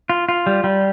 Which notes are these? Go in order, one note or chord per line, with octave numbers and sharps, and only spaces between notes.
F4
F4
G3
G3